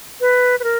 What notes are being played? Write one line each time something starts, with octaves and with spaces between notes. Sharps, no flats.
B4
B4
A#4